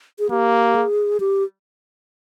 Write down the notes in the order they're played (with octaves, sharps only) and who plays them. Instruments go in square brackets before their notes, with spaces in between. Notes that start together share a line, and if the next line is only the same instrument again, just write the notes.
[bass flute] G#4
[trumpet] A#3 [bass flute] G4
[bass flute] G#4
G4